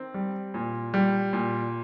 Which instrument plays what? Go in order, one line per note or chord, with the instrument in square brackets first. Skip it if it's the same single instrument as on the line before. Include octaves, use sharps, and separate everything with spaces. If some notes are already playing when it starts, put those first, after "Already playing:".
Already playing: [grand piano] D#3 C4
G3
A#2
G3
A#2